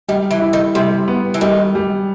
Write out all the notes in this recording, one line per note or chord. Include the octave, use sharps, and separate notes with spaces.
D#3 G3
E3
E4
D#3
C3 G3
B3
E3
D#3 G3
G3